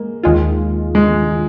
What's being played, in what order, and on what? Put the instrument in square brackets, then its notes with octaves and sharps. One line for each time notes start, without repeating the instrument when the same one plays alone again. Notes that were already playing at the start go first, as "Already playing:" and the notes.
Already playing: [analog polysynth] G#3 [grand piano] A#3
[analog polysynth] D#2 D#3 G#3 F4
[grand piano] G#3